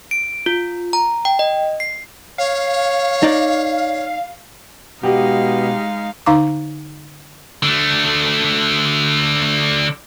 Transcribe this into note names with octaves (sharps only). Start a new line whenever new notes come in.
D7
F4
A#5
G5
D#5
C7
C#5 F5
D#4 D5
B2 G#3 D#4 G4 F5
D3 D#4 F5 A#5 D6
D3 A3